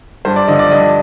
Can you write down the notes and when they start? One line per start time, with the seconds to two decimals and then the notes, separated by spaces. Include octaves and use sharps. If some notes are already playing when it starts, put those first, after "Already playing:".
0.25 G2 C5
0.36 D5
0.48 D3 F3 D#5
0.59 D5
0.71 G2 D#5